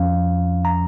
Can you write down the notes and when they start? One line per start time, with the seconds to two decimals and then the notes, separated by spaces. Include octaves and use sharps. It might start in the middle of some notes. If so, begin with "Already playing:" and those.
Already playing: F2 F3 C#4 F5
0.65 A#5